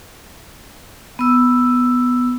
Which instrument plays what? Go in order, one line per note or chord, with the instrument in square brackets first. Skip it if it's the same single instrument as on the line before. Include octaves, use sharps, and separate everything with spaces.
[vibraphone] B3 E6